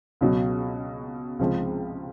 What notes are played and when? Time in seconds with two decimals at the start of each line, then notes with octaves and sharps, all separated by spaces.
0.21 C#2 B2 F#3
1.39 C#2 C3 F3 G#3